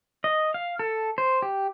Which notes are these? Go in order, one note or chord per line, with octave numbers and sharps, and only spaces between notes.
D#5
F5
A4
C5
G4